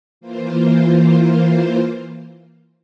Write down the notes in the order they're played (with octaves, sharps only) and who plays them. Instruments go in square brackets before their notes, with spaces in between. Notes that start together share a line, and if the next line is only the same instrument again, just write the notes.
[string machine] E3 A#3 F4 C5